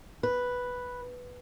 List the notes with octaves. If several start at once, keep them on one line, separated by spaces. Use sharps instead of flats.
B4